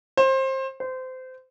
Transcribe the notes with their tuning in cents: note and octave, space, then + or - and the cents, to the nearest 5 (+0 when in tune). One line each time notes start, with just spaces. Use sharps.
C5 +25
C5 -25